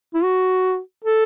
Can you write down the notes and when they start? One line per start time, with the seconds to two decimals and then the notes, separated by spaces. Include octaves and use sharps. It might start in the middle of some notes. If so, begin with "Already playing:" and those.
0.14 E4
0.23 F#4
1.04 A4